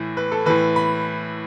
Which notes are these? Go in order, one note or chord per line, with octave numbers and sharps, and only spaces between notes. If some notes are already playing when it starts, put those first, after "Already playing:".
Already playing: A2 E3
B4
A4
A2 E3 B4
B5